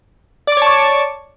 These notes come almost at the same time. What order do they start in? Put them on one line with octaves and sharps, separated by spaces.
D5 D6 C#5 A5 C#6